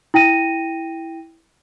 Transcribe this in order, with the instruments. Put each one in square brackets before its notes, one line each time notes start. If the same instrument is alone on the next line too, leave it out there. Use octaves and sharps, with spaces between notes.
[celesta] E4 G5 A#6 D#7